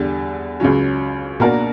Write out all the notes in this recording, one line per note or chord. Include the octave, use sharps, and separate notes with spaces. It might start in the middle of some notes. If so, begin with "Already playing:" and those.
Already playing: E2 D3 G3
C#2 C#3 F#3 C#4
B2 A#3 D4 F#4 A#4